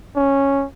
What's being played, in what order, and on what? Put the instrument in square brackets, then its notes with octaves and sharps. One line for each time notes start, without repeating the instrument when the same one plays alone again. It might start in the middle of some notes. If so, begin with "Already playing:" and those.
[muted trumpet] C#4